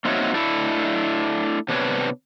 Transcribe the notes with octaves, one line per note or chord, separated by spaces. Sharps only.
A#3 C4 D#4 F#4 C#5 E5
A3 D4 E4
C3 B3 D4 G#4 B4 C#5